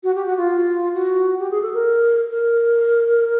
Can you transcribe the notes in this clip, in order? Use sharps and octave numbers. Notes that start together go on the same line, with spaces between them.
F#4
G4
F#4
F4
F#4
G4
G#4
A4
A#4
A#4